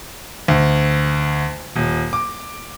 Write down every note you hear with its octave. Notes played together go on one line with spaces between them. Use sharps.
D2
D#1
D6